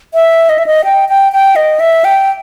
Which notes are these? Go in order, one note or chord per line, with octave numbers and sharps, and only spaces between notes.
E5
D#5
E5
D#5
G5
G5
G5
D#5
E5
G5